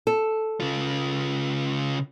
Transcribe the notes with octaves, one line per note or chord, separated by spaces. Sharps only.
A4
C#3 F4